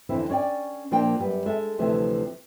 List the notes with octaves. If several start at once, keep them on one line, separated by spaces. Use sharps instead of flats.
F2 D3 E3 C4 E4
C#4 C#5 D5 G5
A#2 F3 A#3 D4 G5
F#2 G3 B3
G#3 A4 E5
D2 C3 E3 F3 A3